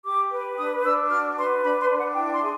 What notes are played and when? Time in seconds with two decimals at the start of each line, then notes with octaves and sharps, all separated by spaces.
0.04 G4 D6
0.31 B4
0.57 D4 D#6
0.84 D4 E6
1.09 F#4 F6
1.37 B4 C6
1.63 D4 B5
1.80 C6
1.90 D4
1.97 F#5
2.15 E4 G5
2.33 C6
2.42 G#4